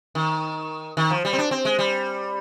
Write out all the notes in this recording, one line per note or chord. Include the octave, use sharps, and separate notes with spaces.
D#3
D#3
F3
G3
C4
D4
C4
G#3
G3